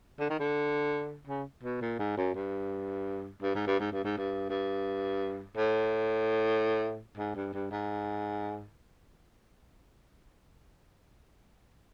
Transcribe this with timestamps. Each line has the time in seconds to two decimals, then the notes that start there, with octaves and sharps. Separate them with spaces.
0.20 D3
0.30 D#3
0.39 D3
1.27 C#3
1.63 B2
1.81 A#2
1.99 G#2
2.17 F#2
2.34 G2
3.42 G2
3.55 G#2
3.67 G2
3.79 G#2
3.92 G2
4.04 G#2
4.17 G2
4.49 G2
5.56 A2
7.17 G#2
7.35 G2
7.53 G2
7.71 G#2